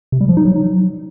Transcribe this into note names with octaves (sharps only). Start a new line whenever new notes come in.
C3
G3
F3
D#4
F#3